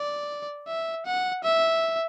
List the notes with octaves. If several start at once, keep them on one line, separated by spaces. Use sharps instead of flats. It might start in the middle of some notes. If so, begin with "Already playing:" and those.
Already playing: D5
E5
F#5
E5